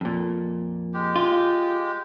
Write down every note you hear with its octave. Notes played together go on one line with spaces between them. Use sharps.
F2 A#2
G#3 G4
F4